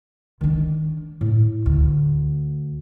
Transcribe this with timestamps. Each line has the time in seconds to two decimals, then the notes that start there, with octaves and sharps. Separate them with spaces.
0.41 D#3 D4
1.21 A2
1.66 D2